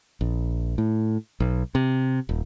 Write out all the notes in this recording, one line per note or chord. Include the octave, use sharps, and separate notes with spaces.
A#1
A2
B1
C3
D#1